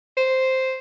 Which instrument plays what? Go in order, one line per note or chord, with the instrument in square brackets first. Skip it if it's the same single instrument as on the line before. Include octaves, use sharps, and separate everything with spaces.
[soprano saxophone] C5